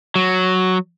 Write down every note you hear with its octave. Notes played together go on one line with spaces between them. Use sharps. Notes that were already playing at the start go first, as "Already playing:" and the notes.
F#3